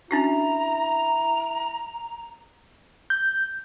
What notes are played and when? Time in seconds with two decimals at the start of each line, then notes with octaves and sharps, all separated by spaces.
0.11 C#4 D4 E4 F#4 A#5
3.10 G6